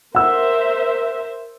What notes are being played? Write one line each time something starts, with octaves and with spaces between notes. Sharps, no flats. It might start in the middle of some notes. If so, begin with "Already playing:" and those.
A#4 C5 E5 F#5 E6